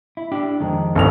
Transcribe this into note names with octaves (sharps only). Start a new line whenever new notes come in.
E4
D4 E4 G4
F2 D#3 G#3
G1 C2 F7